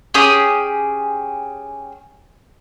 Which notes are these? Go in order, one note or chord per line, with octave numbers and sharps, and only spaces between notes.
C#4 G4 G#4 D#6